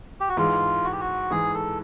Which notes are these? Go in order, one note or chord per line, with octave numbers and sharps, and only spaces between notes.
G4
F#4
G#2 E3 G#3 F4
F#4
G4
F#4
G#2 E3 G#3 G#4
A4